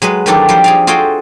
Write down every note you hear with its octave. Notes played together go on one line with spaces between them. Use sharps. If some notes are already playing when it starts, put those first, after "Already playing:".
F#3 G#3 G#4 B4
D#3 E3 F#3 C4 D4 A4
F3 G3 C5
G#4 D5 F5
F4 F#4 G#4 A4 C5 G5